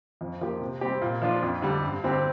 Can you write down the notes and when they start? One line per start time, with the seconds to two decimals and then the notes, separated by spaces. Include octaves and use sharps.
0.21 F2
0.41 F3 A#3 G4
0.61 C3
0.81 G3 C4 G4
1.02 A#2
1.22 F3 D4 F4
1.43 F2
1.62 D3 G3
1.83 G2
2.04 D3 G3 C4 G4